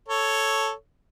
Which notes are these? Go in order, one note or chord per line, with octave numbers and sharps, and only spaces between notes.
A4 C#5